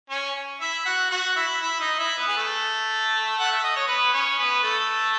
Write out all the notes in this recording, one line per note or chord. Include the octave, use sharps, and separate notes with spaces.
C#4 C#5
E4 E5
F#4 F#5
F#4 F#5
E4 E5
E4 E5
D#4 D#5
E4 E5
B3 B4
G#4
A3 A4
F#5
E5
D#5
C#5
B3 B4
C#4 C#5
B3 B4
A3 A4